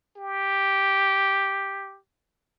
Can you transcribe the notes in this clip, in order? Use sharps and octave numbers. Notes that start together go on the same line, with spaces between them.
G4